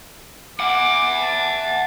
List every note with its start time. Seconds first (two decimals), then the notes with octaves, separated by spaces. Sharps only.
0.60 E5 F#5 D6
1.20 A5